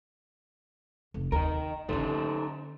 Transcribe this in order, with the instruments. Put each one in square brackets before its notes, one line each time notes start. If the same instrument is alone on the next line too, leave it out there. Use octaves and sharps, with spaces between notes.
[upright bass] F1
[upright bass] D#2 [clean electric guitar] D#3 A#4
[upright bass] D3 C#4 [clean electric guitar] D#4 A4 C5